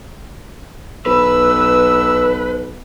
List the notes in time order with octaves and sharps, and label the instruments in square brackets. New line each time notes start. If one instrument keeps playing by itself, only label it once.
[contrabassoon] B1 [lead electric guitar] B4 [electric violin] E6